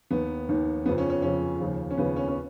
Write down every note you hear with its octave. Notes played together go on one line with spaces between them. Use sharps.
D#2 D#3 B3
D#2 D#3
F2 C#3 F3 B3
C#4
C#4
F2 C#3 F3 C#4
D#2 C#3 F3
C#4
D#2 C#3 F3 B3
C#4
C#4